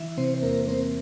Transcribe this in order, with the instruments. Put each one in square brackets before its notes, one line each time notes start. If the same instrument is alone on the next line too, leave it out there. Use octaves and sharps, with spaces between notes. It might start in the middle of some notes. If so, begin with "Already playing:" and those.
Already playing: [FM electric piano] E3 E4 E5
C3 C4 C5
C5
E2 A#3 A#4
A#4
A#3 C4 C5